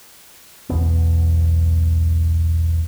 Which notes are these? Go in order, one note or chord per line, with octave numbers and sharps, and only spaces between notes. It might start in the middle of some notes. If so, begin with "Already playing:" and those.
B1 E2 B3